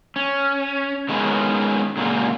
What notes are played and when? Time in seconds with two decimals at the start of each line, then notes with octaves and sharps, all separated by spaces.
0.16 C#4
1.09 D#3 G3 G#3 A#3 B3 C#4
1.97 A#2 C#3 F#3 G#3 A#3